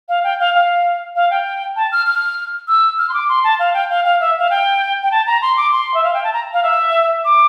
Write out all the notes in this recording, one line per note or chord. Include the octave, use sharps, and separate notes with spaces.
F5
G5
F5
F5
F5
G5
A5
F6
F6
E6
F6
C6
D6
C6
A5
F5
G5
F5
F5
E5
F5
G5
G5
A5
A#5
C6
D6
C6
E5
F5
G5
A5
A#5
F5
E5
D6